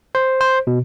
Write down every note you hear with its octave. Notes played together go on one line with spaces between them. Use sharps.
C5
C5
B2